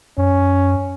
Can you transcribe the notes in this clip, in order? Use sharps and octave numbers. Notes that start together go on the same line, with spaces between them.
F#2 C#4